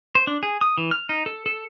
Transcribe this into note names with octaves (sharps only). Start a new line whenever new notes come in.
C5
D4
G#4
D#6
E3
F6
D#4
A4
A4